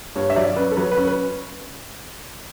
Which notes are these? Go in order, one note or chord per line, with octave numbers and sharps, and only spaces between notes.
G2 C#5
E5
F#3 D5
C#4 B4
A4
F#3 B4
B4
C#4
B4